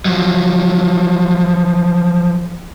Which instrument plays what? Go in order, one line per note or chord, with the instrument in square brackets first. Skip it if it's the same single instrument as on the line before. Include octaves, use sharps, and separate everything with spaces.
[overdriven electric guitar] F3 F#3